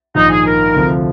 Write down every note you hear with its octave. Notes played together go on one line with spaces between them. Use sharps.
A#1 G#2 D#3 D#4
G#4
A#4
D2 C3 F3